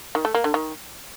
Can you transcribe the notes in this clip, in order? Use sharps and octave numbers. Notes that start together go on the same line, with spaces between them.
D#3
A3
A#3
D3
D#3